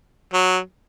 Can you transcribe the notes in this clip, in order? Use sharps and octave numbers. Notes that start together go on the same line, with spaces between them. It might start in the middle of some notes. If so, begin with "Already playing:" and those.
F#3